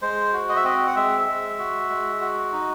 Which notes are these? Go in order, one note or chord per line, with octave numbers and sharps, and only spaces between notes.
G#3 C5
F#4
D#5
E5
C4 D#5
F#5
G#3 E5
G#3
F#4
G#3
F#4
D#4